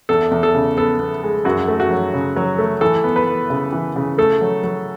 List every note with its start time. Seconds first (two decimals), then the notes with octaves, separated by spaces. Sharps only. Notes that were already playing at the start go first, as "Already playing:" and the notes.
0.09 E2 A4
0.31 E2
0.43 A4
0.54 C#3
0.77 B3 A4
1.00 B3
1.23 G#3
1.45 F#2 F#4
1.68 A3
1.80 F#4
1.91 F#3
2.13 C#3
2.36 F#3
2.58 A3
2.81 E3 A4
3.04 B3
3.16 B4
3.27 B3
3.50 C#3
3.72 E3
3.96 C#3
4.18 A3 A4
4.41 F#3
4.63 F#3